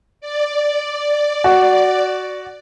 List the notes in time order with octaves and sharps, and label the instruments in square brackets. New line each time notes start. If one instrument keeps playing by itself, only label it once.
[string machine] D5
[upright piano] F#4